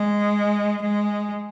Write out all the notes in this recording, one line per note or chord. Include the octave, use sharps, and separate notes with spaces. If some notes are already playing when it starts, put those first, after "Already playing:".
Already playing: G#3
G#3